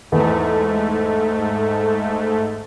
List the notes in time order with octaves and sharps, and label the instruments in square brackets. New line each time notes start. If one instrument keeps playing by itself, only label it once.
[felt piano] E2 [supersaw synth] G#2 A3